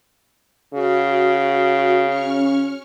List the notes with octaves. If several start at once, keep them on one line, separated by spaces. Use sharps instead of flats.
C#3 F#4
C#4 C#6 F6